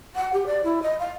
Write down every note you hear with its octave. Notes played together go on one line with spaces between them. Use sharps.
F#5
G4
D5
E4
D#5
F5